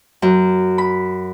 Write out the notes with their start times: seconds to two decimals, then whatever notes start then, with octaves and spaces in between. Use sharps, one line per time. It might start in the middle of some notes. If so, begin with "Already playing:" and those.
0.22 F#2
0.78 B5